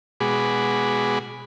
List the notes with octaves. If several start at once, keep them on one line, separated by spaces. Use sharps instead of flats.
B2 G#3 F#4 G#4 B5 D6